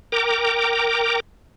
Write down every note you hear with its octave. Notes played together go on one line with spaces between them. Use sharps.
A#4 G5 A#5 D6